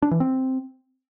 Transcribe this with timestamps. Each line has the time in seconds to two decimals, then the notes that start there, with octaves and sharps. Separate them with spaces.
0.02 D4
0.11 E3
0.20 C4